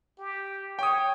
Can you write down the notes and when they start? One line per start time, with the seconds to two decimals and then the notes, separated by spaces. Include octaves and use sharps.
0.19 G4
0.79 C#5 G5 D#6